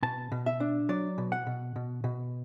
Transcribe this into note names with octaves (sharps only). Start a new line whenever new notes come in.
B2 A5
B2
E5
D4
F#3 D5
B2
F#5
B2
B2
B2